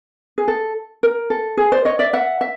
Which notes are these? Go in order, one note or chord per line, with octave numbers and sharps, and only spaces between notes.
G#4
A4
A#4
A4
G#4
C5 D5
C#5 D#5
D5 E5
E5 F#5
E5